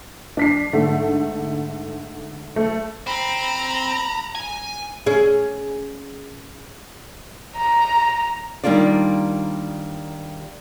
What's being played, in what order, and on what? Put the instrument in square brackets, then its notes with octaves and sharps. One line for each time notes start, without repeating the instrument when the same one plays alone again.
[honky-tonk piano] D4 B6 C7
G#2 D3 A3
A3
[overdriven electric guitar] C4 [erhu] A#5 [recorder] B5
[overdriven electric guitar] G#5
[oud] C#4 G#4
[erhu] A#5
[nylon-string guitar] D#3 G3 A#3 D4 F4 D5